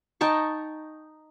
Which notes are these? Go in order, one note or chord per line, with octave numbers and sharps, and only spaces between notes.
D#4 G5 A5 C#6